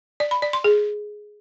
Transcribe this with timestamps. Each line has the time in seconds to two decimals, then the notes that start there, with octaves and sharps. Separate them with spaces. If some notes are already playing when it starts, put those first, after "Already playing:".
0.20 D5
0.31 B5
0.42 D5
0.53 C6
0.64 G#4